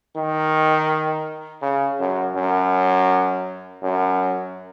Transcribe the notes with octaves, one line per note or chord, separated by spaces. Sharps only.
D#3
C#3
F#2
F#2
F#2